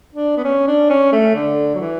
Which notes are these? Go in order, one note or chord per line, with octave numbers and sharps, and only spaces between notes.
D4
B3
C#4
D4
C#4
A3
D3
F#3
E3